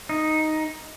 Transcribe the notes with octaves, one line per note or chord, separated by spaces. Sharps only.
D#4